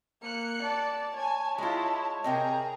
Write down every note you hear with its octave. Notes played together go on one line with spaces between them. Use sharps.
A#3 F#6 C#7
D5 A5
C#5 G#5
G#3 E4 F4 D#5
C3 C4 G#4 A#4 D#5 A#5